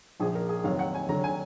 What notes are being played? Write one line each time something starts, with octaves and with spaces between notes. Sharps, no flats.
A#1 A#2 F3 G#4
A#4
G#4
F1 D#2 D#3 F#3 F5
F#5
G#5
D#2 D3 F#3 A#5
G#5